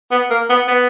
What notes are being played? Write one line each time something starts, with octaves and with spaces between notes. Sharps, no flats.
B3
A#3
B3
B3